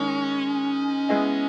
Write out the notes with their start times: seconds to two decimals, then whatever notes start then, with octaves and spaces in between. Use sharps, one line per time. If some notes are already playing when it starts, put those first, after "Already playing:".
Already playing: D#3 G#3 C#4 D#4
1.09 G#3 B3 E4 G#4 D#5